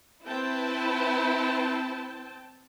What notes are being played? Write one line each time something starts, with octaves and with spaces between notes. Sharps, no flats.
C4 E4 B4 G5 A5